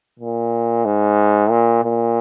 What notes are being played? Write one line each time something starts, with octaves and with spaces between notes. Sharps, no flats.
A#2
G#2
A#2
A#2